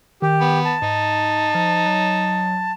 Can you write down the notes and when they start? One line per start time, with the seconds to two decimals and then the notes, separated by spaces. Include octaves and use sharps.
0.22 D#3 G4
0.41 B3
0.65 A5
0.82 G#2 D#4
1.55 F3
1.86 F#3